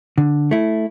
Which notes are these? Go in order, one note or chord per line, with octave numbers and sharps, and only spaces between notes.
D3
A3 E4